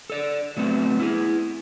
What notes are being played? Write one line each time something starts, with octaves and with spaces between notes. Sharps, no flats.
A4 D5
F#3 A3 B3 C4
E4 G#4